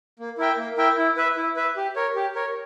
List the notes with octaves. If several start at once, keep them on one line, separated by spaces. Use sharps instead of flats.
A#3
E4 A#4 E5 G5
A#3
E4 A#4 E5 G5
E4
B4 E5
E4
B4 E5
G4
A#4 C#5
G4
A#4 C#5